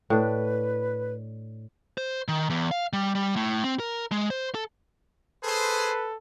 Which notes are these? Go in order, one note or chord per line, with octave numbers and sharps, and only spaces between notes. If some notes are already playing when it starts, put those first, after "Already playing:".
A2 D4 B4
C5
D#3
E2
F5
G3
G3
A2
C4
A#4
G#3
C5
A4
G#4 A4 B4 C5